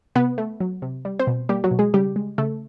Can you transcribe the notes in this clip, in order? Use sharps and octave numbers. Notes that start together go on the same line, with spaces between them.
C3 B3 B4
A3
F#3
C3
G3
C4 C5
B2
G3 A#3 G4
F#3 F#4
B2
G#3 G#4
C#3 G3 G4
G#3
C#3 A3 A4